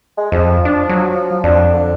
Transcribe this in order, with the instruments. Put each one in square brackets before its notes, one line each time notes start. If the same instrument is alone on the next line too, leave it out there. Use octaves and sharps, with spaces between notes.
[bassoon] G#3
[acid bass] F2 [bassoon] F3
[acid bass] D4
F#3
[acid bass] F2 [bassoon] D4
[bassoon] D3